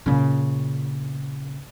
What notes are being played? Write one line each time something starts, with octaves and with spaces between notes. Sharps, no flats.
A#2 C#3